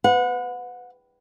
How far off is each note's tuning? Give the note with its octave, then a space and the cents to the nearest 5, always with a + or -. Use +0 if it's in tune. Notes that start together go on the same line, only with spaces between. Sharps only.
B4 +25 F#5 -30